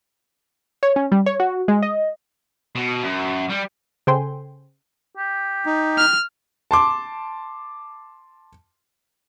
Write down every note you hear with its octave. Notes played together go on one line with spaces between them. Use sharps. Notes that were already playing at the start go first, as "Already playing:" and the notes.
C#5
C#4
G3
C#5
F#4
G#3
D#5
B2
F#2
G3
C#3 A4 C5 G5 G#5 C6
G4
D#4
F6
A5 C6 D6